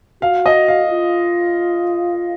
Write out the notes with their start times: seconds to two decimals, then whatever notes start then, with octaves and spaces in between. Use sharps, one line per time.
0.22 F#4 F5
0.46 D#5
0.68 F5
0.91 F4